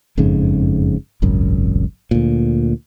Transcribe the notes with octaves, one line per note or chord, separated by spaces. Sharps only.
F#1 F2 G#2 C#3
D#1 G#1 C#2 F#2
D2 A#2